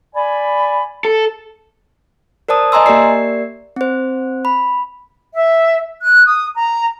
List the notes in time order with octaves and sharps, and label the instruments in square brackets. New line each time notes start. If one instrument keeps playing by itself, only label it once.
[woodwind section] D5 G#5 B5
[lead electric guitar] A4
[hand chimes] A#4 C5 D5 A5 D#6
D#5 G#5 A#5 C6 E6
A#3 G4 A#4 D5 C7
C4 C5
B5
[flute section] E5
F#6
D#6
A#5